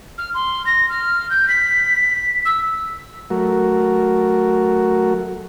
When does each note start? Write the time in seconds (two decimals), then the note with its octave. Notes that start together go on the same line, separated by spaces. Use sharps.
0.18 F6
0.34 C6
0.66 A#6
0.90 F6
1.30 G6
1.48 B6
2.45 E6
3.30 F#3 A3 F#4 A#4